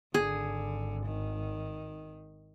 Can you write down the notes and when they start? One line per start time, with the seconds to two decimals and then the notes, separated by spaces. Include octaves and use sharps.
0.14 G#1 D3 G#4
1.06 D#3